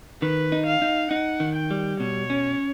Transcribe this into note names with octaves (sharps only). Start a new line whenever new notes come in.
D#3 B4
D#4
F5
D#4
D#4 F#5
D#3
G5
G3
B2 C#5
C#4